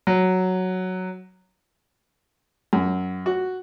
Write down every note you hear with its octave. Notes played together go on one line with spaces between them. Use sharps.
F#3
F#2
F#4